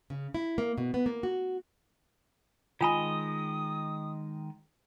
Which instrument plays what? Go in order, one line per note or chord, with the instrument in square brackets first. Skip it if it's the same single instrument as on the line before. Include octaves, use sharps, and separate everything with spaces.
[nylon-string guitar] C#3
E4
A#3
B2
B3
A#3
F#4
[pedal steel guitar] D#3 G#3 D#5 [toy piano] F4 G#5 B5 [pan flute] D#6